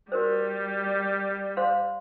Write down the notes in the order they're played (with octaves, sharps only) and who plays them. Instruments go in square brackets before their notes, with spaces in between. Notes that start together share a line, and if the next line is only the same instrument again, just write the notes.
[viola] G3 [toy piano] F#4 A#4 C5
[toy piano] C5 F5 C6